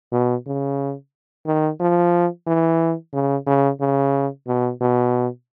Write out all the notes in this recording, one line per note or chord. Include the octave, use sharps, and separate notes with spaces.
B2
C#3
D#3
F3
E3
C#3
C#3
C#3
B2
B2